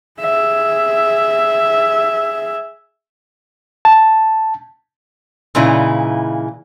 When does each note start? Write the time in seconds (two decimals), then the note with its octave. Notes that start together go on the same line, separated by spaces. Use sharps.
0.20 G#4 E5
3.85 A5
5.55 A#2 C#3 E3 D#4 E4